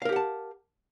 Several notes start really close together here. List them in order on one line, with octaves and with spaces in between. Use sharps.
F5 A#4 G4 F#5 A5